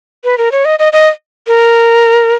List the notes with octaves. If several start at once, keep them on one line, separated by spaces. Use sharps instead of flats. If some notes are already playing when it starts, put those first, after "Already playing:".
B4
A#4
C#5
D#5
D#5
D#5
A#4